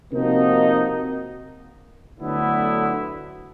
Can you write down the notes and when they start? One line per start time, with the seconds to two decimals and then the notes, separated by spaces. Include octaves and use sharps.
0.11 C3 F3 A#3 D#4 F#4
2.19 D2 D3 F#3 B3 E4